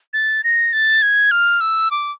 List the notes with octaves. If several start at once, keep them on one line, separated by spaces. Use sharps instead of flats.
A6
A#6
A6
G#6
F6
E6
D6